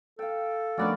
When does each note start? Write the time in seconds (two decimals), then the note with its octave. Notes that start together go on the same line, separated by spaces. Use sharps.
0.19 A4 F5 G5
0.78 D#3 F3 A3 B3 C#4 D4 F#4 D5